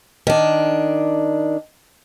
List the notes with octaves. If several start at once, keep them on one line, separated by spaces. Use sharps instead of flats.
D#3 D4